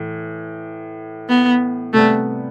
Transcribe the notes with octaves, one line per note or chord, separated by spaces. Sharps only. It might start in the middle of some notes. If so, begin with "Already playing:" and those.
Already playing: A2 E3
B3
C3 G3 A3 B3